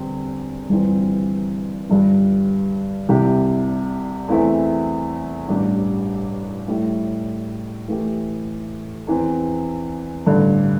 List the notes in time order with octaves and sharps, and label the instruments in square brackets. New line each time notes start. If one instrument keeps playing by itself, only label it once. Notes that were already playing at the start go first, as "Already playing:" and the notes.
Already playing: [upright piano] E2 D3 G3 C4
G1 G2 E3 C4
G1 G2 G3
C2 C3 G3 E4 G4
E2 E3 A3 C4 E4
A1 G2 G3 D4 G4
A2 G3 E4
A2 E3 A3 E4 G4
E2 E3 C4
A1 G2 D3